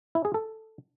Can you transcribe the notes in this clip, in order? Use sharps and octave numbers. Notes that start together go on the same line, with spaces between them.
E4
G#4
A4